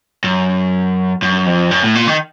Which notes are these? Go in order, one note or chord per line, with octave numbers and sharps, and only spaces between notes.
F#2
F#2
F2
F#2
A2
A#2
D#3